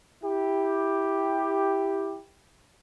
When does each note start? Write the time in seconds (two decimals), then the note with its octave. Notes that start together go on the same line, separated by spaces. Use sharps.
0.23 E4 G4